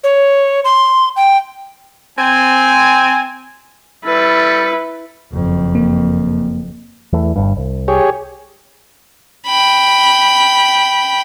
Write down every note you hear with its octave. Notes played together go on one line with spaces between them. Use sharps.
C#5
C6
G5
C4 G#5
G3 E4 A4 B4
F#1 F2
A#3
E2 E3 A3
G1 G2
C2
G4 G#4 C#5
G5 B5